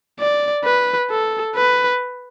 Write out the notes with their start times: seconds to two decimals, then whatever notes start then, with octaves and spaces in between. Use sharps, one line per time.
0.20 D5
0.65 B4
1.10 A4
1.56 B4